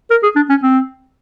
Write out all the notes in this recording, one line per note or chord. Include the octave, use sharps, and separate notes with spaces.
A#4
G#4
D4
C#4
C4